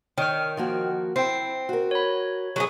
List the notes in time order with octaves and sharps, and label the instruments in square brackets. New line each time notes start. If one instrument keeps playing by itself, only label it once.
[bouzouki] D#3 [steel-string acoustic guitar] C#5 [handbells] G5 F6
[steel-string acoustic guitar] F3 A#3 F#4
[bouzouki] C4 [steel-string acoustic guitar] E4 [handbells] G5 C7
[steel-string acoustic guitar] F#4 A#4
[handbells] C#5 B5
[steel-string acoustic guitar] F2 [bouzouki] F#3 G4 G#4